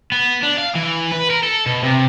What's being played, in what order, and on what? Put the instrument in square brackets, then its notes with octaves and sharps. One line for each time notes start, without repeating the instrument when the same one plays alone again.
[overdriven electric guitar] B3
D4
F5
E3
B4
A#4
A4
B2
C3